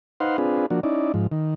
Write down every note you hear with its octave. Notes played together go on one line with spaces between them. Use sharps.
D#4 B4 C5 F5 F#5 C6
C4 D4 F4 G#4 B4
F3 A#3 D4 F#4
C#4 D#4 E4 D5
G#2 F3
D#3